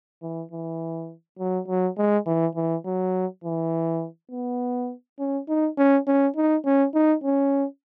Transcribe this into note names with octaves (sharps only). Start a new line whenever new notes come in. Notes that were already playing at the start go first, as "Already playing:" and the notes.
E3
E3
F#3
F#3
G#3
E3
E3
F#3
E3
B3
C#4
D#4
C#4
C#4
D#4
C#4
D#4
C#4